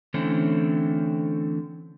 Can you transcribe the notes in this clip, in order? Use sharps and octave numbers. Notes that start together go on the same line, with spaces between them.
D3 E3 A3 C4 C#4